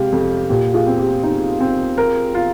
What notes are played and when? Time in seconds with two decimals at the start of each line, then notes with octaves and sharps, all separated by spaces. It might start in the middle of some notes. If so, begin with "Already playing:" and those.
Already playing: C3 G#3 G4 F5
0.12 F2
0.50 A#2 G4
0.74 F4 G#4
0.87 C4
0.99 G4
1.23 D#4
1.60 C4
1.98 A#4
2.35 F4